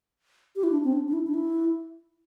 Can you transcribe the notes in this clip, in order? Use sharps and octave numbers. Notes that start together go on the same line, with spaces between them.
G4
E4
D4
C4
D4
D4
E4
D4
E4